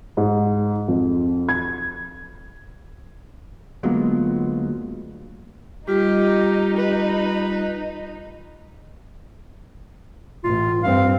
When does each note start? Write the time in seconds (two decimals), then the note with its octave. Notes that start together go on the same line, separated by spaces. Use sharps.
0.17 G#2
0.88 F2
1.49 G#6
3.83 D2 F#3 G#3 A#3 B3 F4
5.88 G3 D#4 F4 G4
6.77 B4
10.44 A1 F4
10.83 G2 C4 F5